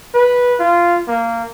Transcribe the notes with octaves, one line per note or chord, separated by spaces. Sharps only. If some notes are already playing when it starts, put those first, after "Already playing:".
B4
F4
A#3